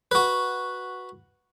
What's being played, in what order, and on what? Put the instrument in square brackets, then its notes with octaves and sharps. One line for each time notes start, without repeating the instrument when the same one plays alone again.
[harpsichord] F#4 B4